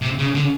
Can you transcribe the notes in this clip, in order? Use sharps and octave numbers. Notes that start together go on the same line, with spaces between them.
C3
C#3
D3